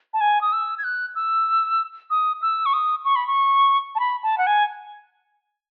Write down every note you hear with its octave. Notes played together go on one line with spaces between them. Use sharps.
A5
G#5
D#6
E6
G#6
F#6
E6
D#6
E6
C#6
D#6
C#6
B5
C#6
A5
B5
A5
F#5
G#5